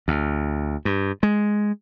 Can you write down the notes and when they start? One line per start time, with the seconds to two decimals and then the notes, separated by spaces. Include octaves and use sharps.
0.08 D2
0.85 G2
1.23 G#3